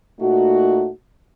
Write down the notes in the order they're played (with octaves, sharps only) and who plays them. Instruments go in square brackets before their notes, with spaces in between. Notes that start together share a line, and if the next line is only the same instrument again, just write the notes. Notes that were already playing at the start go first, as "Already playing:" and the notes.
[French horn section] A#2 A3 D#4 F#4